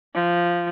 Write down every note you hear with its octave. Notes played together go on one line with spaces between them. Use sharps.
F3